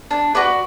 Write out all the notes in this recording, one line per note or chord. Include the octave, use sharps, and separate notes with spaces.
D4
F#4 B4 D5